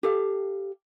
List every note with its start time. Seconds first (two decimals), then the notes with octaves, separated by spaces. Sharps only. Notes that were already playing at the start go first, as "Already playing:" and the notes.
0.03 G4 A4 F5